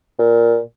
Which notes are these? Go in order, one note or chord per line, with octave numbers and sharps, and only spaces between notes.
A#2